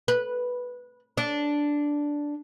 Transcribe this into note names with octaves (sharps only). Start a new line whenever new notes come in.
B4
D4